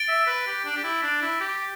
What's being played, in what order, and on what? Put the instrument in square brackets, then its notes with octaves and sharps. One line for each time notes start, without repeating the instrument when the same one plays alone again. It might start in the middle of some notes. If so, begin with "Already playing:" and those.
Already playing: [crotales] A6 D7 G7
[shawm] E5
B4
G4
D4
G4
E4
D4
E4
G4